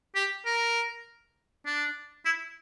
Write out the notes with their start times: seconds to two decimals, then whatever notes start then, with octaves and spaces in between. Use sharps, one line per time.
0.15 G4
0.45 A#4
1.66 D4
2.26 E4